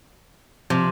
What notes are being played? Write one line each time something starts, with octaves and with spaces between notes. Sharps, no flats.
C3 F3